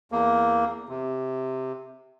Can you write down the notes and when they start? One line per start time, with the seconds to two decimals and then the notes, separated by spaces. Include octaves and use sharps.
0.12 E2 A#3
0.89 C3